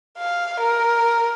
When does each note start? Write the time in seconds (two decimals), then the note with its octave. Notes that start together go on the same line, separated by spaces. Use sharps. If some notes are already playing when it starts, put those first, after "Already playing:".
0.18 F5
0.60 A#4